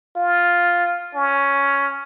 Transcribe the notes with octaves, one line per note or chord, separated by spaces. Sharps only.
F4
C#4